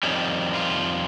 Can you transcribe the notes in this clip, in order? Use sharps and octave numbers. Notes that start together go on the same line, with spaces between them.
F2 D#3 G3 C#4
F4